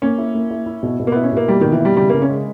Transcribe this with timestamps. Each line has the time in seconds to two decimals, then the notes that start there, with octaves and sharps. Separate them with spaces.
0.02 A#3 C#4
0.18 E4
0.35 A#3
0.51 E4
0.66 E4
0.83 B2
1.00 B2
1.07 A#3
1.12 B3 E4
1.23 C#4
1.33 B2 A#3
1.48 G3 A#3
1.61 B2 D#3
1.72 E3
1.80 G3 E4
1.97 C#3 G3
2.09 C#3 A#3
2.22 C#4
2.29 G#3